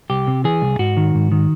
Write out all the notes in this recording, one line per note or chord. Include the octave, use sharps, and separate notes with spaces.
C2 G4
C3
E3 G#4
C2
G#2 F#4
D#3
G#2
D#3